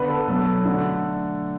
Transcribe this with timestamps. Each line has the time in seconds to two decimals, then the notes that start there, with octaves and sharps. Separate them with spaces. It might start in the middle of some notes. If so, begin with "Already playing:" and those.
Already playing: D3 B3 B4
0.09 A4
0.28 B2 F#3 B3 A4
0.65 D3 A3